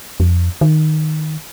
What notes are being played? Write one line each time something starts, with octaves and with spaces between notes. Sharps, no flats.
F2
D#3